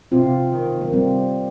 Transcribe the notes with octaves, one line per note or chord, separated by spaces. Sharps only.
C3 C4 F4
D#3
A#3
C3 G3 C4